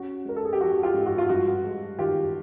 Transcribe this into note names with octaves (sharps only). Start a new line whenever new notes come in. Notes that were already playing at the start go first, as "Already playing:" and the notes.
Already playing: C#4 F#4
G#3 A#4
A4
G#4
G4
F3 F#4
F4 G4
G#2
F#4
F4
G2 F#4
G#3
D#3 F4 G4